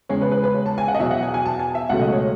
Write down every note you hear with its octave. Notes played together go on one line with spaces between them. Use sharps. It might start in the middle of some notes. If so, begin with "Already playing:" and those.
E2 C#3 G#3 C#5
B4
B4
B4
C#5
A5
G#5
F#5
D#5
E2 B2 F#3 E5
F#5
G#5
G#5
A5
G#5
E5
C#2 B2 F#3 A3 F#5
D#5
C#5